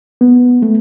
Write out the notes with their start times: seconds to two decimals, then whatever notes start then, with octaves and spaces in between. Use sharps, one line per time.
0.21 B3
0.62 A3